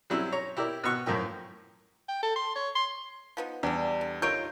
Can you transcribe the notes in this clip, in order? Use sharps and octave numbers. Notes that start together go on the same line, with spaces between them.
F#3 G3 C4 C#4 E4
C#5 A#5
E4 G4 A#4 D5
B2 C#6 F#6
F#2 A2 F3 A#4 G5
G5
A4
C6
C#5
C6
F3 B3 D#4
E2 G3 D4
D3
D#4 F4 A4 A#4 C#5 G6 D7